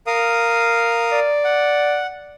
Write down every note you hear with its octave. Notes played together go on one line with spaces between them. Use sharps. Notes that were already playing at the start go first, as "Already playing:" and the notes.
A#4 F5 D#6
D5
F#5